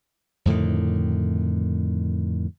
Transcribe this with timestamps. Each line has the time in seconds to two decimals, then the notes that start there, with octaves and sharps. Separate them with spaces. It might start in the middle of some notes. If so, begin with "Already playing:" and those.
0.45 F2 A2 D3 D#3